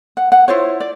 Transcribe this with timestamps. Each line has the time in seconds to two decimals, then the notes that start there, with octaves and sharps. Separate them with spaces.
0.17 F#5
0.32 F#5
0.48 E4 F4 C5 C#5
0.80 D5